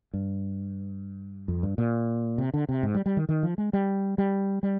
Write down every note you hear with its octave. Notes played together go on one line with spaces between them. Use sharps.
G2
F2
G2
A#2
C3
D3
C3
G#2
G3
G3
D#3
D#3
F3
G#3
G3
G3
G3